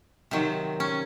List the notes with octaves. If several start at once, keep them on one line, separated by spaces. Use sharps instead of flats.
C3 D#3 F#3
C#4